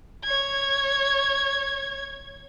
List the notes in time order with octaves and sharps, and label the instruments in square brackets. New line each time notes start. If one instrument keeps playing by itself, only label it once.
[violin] C#5 G#6